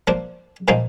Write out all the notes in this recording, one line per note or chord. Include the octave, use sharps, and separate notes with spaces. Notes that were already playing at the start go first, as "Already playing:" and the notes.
F3 A#3 D4
A#2 F3 A#3 D#4